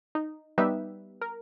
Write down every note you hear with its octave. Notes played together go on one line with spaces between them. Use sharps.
D#4
G3 B3 D#4 G4 B4 E5
A#4